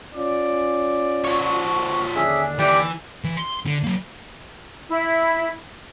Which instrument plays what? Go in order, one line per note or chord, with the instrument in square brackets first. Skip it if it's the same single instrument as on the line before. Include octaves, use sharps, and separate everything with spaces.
[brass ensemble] C#4 F4 D5
[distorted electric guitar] F3 C#5 [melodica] F#4
[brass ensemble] D#2 D3 D4 [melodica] C#4 G#4 E5
[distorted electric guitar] E3 [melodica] G4 D5 G5
[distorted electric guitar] E3
C6
D3
F#3 A#3
[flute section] E4